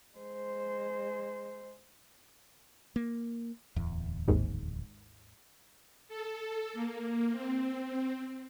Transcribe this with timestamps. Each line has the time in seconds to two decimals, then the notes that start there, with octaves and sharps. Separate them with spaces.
0.18 G#3 C5
2.96 A#3
3.76 D1 E2
4.28 G#1 D#2 G#2
6.08 A4
6.73 A#3
7.32 C4